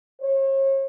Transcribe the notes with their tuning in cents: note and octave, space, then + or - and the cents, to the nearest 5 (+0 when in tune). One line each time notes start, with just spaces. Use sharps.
C#5 -40